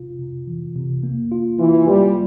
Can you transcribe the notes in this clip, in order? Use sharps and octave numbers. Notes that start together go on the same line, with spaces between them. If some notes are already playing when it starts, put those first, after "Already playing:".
Already playing: C3 F4
C3
E3
C3
A#3
F4
E3 F4
G3 F4